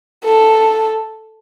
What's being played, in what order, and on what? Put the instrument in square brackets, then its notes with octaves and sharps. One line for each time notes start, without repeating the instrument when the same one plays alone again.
[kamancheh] A4